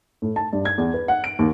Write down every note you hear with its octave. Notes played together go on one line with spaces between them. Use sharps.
A2
A5
G2
G#6
E2
B4
F#5
D7
D#2